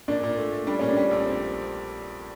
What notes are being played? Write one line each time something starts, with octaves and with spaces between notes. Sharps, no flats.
A#2 D4
A#2
A3
A3
G3 D4
A#2 C#4
G3 D4
A#1
C4